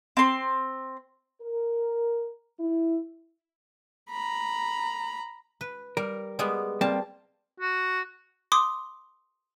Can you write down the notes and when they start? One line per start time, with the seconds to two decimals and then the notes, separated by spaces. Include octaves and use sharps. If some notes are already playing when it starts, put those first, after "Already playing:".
0.17 C4 C6
1.42 A#4
2.60 E4
4.11 A#5 B5
5.61 B4
5.97 G3 A#4
6.39 G3 G#3 B3
6.81 G3 A#3 C4 A5
7.60 F#4
8.52 C6 D6 D#6